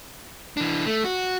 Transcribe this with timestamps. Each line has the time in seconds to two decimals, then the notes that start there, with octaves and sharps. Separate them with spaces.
0.57 E3 D4
0.86 A3
1.05 F#4